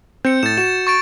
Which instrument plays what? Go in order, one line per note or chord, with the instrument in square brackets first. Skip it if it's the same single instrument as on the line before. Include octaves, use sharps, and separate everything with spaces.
[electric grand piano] C4 [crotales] G6 C#7
[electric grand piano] A2 [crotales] A6 E7
[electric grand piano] F#4 [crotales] E7
[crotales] C#6 A6 D7